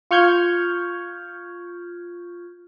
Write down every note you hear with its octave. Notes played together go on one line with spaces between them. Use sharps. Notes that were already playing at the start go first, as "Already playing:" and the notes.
F4 C#6 F6 G6 G#6